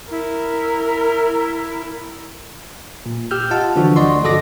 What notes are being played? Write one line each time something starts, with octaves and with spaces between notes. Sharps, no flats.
E4 A#4
A#2
G4 E6 F6 G6
F4 D#5 F#5 A5
D3 E3 F3 D4 F#4
D2 D5 D#5 F#5 C6 C#6
G1 F#4 A4 D#5 D6 A#6